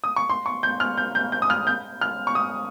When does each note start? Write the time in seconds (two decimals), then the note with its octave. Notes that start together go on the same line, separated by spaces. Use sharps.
0.04 D#6
0.16 C#6
0.29 C6
0.46 C#6
0.63 G6
0.80 F6
0.97 G6
1.15 G6
1.32 G6
1.42 D#6
1.50 F6
1.67 G6
2.01 F6
2.27 C#6
2.35 D#6